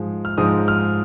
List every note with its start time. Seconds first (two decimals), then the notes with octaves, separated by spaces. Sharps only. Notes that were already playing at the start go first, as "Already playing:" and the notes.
Already playing: G#2 F3 G#3
0.25 F6
0.38 G#2 F3 G#3 D#6
0.68 F6